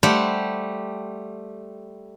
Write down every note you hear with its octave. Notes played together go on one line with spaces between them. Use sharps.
G3 A3 G4 C5 F#5